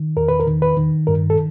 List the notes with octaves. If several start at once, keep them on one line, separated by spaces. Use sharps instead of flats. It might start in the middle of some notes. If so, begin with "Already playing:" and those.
Already playing: D#3
E2 A#4
B4
A#4
D#3
B4
D#3
G2 A#4
A4